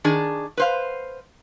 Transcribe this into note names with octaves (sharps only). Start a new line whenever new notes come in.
D#3 D4 G#4
B4 C5 F5